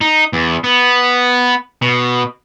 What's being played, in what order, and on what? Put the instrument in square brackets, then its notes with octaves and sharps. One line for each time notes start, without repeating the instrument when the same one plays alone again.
[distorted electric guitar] D#4
E2
B3
B2